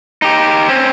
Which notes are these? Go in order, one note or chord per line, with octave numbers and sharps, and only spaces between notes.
D#4 G4
C4 C#4